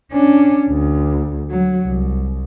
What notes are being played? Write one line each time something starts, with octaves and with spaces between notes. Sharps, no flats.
C#4 D4
D2
F#3
C2